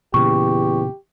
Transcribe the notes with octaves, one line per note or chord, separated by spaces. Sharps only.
E2 A#2 C#3 G4 C#6